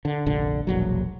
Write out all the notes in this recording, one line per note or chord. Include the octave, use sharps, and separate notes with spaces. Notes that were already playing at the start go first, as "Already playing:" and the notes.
D3
F1 A#1 D3
E1 A#1 F#3